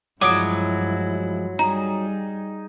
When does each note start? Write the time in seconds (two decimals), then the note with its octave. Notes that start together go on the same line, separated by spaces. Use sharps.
0.21 G2 F3 F#3 G#3 E4 D6 D#6 D7
1.59 G3 D#4 G#4 A#5